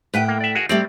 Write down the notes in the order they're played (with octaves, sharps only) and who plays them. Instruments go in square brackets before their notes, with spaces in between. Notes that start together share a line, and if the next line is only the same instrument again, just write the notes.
[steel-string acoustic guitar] A2 F#5 G5 [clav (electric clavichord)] B4
[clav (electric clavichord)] A#3
D5 E5
F#4 G#4 A#4
[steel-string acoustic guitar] G3 A3 G4 [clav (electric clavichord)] C4 D5